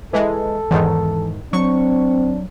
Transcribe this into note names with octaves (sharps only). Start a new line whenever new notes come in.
E3 G#3 A4
E2 G#2 D#3 E3
F#3 C4 D4 C#6